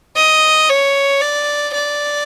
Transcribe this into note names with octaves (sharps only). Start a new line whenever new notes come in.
D#5
C#5
D5
D5